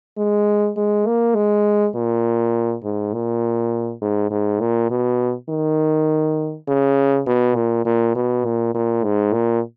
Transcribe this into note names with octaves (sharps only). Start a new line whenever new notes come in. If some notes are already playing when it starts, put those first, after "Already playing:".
G#3
G#3
A#3
G#3
A#2
G#2
A#2
G#2
G#2
A#2
B2
D#3
C#3
B2
A#2
A#2
B2
A#2
A#2
G#2
A#2